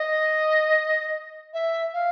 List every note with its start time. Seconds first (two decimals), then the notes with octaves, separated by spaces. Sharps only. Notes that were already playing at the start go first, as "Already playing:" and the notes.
Already playing: D#5
1.54 E5
1.93 F5